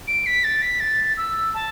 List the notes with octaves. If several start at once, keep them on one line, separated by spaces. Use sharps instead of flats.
D7
B6
A6
B6
A6
E6
A5